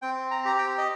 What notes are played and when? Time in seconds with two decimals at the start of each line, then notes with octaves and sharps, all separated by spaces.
0.02 C4 G5
0.31 A#5
0.45 G4 A#5
0.59 G5
0.78 D#5